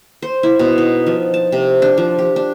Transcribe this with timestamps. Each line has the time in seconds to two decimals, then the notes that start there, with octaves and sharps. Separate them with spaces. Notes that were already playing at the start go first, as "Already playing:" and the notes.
0.22 C5
0.43 E4
0.59 B2
0.78 D#4
1.07 F3
1.34 A5
1.52 C3
1.82 D4
1.98 F3
2.19 G4
2.36 D4